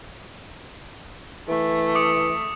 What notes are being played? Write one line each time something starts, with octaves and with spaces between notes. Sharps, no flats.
E3 A3
D6 D#6 C#7